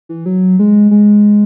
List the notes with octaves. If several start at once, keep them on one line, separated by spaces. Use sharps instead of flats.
E3
F#3
G#3
G#3